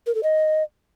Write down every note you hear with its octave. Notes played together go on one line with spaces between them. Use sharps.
A#4
A4
D#5